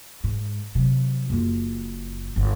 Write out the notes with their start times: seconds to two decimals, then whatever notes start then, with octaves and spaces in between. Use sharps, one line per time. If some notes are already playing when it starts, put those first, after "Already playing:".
0.24 G#2
0.75 C3 F#3
1.30 F#1 F4
2.36 G1